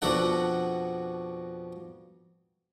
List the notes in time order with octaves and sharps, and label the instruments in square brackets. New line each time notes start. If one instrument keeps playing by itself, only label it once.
[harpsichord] F2 B2 D4 F#4 A4 F#5